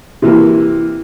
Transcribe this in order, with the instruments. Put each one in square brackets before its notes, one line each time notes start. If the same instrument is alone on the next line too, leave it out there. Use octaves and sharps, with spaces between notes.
[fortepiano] C3 E3 A#3